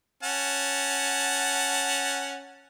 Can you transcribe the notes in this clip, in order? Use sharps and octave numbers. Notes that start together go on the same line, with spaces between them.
C#4 F#5 A5